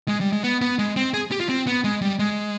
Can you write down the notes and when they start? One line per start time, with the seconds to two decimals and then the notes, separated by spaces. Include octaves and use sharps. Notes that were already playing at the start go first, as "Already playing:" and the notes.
0.08 G#3
0.21 G3
0.33 G#3
0.44 B3
0.62 B3
0.79 G#3
0.96 C4
1.14 G#4
1.31 G4
1.40 F4
1.49 C4
1.67 B3
1.84 G#3
2.01 G3
2.19 G#3